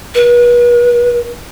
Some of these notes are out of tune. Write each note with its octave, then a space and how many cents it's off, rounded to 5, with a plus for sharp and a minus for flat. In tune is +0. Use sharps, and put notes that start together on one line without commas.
B4 -40